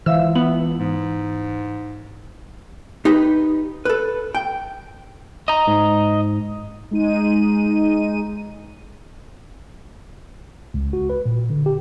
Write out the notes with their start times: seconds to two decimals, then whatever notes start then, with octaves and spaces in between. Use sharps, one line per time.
0.06 C#2 E3 C5 E5 F5 E6
0.35 B3 F#7
0.78 G#2
3.05 D#4 G4 B4
3.85 A4 B4
4.35 G5
5.48 D#5 A#5
5.67 G#2
6.91 G#3 D#4 D#7
10.74 C#2
10.93 F#4
11.10 B4
11.26 A#2
11.50 D3
11.66 G4